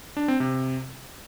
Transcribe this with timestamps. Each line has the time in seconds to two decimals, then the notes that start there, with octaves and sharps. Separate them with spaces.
0.17 D4
0.28 C4
0.40 C3